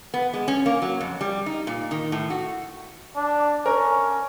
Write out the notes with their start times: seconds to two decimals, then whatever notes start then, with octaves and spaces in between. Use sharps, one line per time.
0.14 B3
0.33 G#3
0.48 C#4
0.66 A#3
0.82 F#3
1.01 F2
1.21 G3
1.46 D#4
1.67 A#2
1.91 D#3
2.12 A2
2.30 F#4
3.16 D4
3.66 C#4 A#4